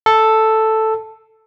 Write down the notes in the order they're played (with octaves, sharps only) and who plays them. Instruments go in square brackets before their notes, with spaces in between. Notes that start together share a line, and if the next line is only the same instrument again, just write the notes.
[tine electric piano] A4